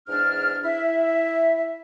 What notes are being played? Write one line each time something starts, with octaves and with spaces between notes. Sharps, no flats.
E2 G#2 D4 F6
E4 E5